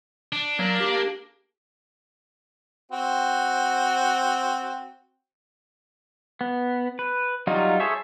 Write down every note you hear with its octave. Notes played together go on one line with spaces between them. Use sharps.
D4
F#3 A#3
G4
C4 F#4
B3
B4
F#3 G3 D#4 F4
G#4 A4 C5 C#5 E5